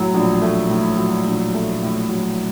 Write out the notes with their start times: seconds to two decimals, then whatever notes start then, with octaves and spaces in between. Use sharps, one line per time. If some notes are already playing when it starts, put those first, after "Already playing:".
Already playing: A2 F#3
0.14 A#1
0.42 A3
0.70 A2
0.98 F#3
1.26 A#1
1.54 A3
1.83 A2
2.10 F#3